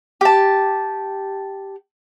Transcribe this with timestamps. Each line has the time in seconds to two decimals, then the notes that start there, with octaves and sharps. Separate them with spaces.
0.21 G4 A5